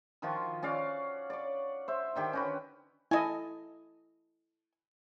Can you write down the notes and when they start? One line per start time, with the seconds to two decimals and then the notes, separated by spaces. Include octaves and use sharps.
0.22 D#3 F3 F4 F#4
0.62 C#4 F#4 D5 F5
1.30 C#5 D5
1.88 C5 E5
2.15 D3 D#3 G4
2.33 C#4 F#4 B4
3.11 E4 A4 D#5 G#5